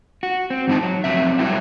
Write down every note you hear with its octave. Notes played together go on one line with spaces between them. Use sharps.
F#4
C4
E2 G#2 C4 D#4 A5
F#3
F2 F#3 C4 E5
F#3 G3 E4 F#4 G4 E5